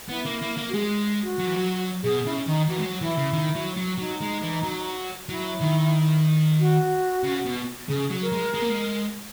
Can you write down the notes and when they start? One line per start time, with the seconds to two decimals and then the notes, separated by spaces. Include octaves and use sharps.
0.08 B3 E4
0.25 A#3
0.42 A#3
0.57 A#3
0.69 F#4
0.74 G#3 G#4
1.23 F#4
1.39 F#3
1.47 E3
1.56 F#3
2.03 B2 G#4
2.25 C#3 E4
2.47 D#3 D#4
2.68 E3 F#4
2.78 G#3
2.85 F#3
3.01 E3 E4
3.17 C#3
3.33 D#3
3.55 F#3
3.77 F#3
3.99 F#3 D#4
4.21 G#3
4.42 E3
4.63 F#3
5.29 F#3 E4
5.61 D#3
6.60 F#4
7.23 C#3
7.46 B2
7.89 C#3 G#4
8.11 F#3
8.22 A#4
8.33 G#3
8.54 G#3
8.62 A#3
8.70 G#3